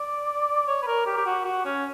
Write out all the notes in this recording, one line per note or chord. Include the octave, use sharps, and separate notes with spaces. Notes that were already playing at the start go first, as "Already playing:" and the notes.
Already playing: D5
C#5
B4
A#4
G4
G4
F#4
F#4
C#4